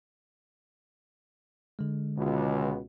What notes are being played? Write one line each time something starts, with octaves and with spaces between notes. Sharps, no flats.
D3 G#3
C#2 B2